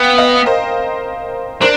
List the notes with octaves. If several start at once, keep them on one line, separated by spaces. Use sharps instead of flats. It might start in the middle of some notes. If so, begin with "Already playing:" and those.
Already playing: B3 F5 G5
D#5 F5
A#4 C5
D4 A#4 C5